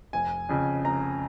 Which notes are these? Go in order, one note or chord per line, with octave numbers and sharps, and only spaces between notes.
F1 G#5
F2 C#3
F1 A#5